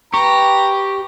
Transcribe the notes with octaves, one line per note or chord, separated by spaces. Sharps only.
G4 B4 G5 A#5 C#6